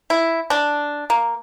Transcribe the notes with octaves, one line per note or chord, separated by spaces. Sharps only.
E4
D4
A#3